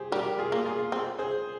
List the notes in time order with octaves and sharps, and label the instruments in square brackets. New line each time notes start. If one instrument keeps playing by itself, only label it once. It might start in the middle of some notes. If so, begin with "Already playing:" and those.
Already playing: [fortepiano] G4 G#4 C5
[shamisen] G3 [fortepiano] G4 A#4
[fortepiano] F4 G#4
[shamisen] A#3
[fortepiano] F4 G#4
[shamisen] C4
[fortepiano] G#4 C5